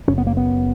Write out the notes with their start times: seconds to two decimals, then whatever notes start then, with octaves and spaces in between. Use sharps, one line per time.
0.08 F#1 F#2 C#3 C#4
0.18 B3
0.27 A#3
0.37 B3